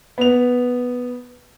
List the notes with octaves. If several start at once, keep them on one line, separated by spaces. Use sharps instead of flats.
B3 F7